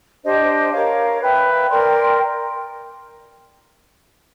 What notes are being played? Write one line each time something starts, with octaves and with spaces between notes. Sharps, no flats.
D4 G4 C5 D#5
A#4 C#5 F5
B4 E5 G5
A#4 D5 G5 C6